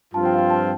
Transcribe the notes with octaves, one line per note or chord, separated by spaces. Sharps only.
G2 F3 C4 F4 A5
G5
F5
G5
A5